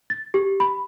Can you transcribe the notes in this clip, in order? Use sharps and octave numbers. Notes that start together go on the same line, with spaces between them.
A6
G4
B5